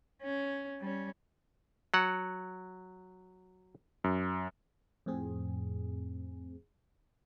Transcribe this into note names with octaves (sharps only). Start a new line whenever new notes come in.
C#4
G3 C#4
F#3 F#5
F#2
F2 A2 C4 G#4